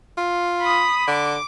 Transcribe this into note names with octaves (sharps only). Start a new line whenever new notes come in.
F4
B5 D#6
D3 D6